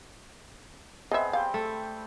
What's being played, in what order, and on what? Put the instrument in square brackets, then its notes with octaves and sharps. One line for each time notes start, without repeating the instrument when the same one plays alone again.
[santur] B3 C4 G#4 [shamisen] D#5 E5
[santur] G3 C5 G5 [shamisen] F5
[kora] A3